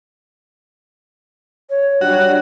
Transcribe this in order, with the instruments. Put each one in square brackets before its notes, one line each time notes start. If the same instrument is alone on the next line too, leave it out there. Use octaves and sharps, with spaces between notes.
[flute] C#5
[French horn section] F#3 G3 D4 [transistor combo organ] F#4